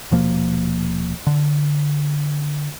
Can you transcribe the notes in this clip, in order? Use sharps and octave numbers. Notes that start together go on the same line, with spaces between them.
D#1 B2 F3 A#3
D3